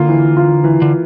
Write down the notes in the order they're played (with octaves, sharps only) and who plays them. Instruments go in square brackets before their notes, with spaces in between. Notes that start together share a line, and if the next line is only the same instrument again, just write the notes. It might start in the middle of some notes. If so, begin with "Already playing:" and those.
Already playing: [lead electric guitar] D3 [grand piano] A#3 F4
[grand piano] E3
F4
E3
[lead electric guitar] D3